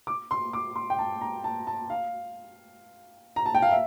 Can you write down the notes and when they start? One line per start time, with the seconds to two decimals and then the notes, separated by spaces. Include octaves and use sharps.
0.07 D6
0.31 C6
0.53 D6
0.76 C6
0.90 G5
0.99 A5
1.21 A#5
1.44 A5
1.67 A5
1.90 F5
3.36 A#5
3.46 A5
3.54 G5
3.62 F5
3.71 E5